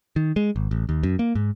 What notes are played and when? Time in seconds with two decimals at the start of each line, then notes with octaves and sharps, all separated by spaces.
0.16 D#3
0.36 G#3
0.56 G#1
0.71 A1
0.89 D#2
1.03 F#2
1.19 A#3
1.35 G#2